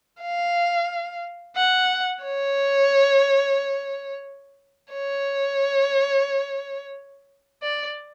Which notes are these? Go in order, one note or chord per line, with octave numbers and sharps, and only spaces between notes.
F5
F#5
C#5
C#5
D5